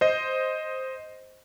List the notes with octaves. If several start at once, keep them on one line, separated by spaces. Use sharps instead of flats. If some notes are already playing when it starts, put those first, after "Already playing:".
C5 D#5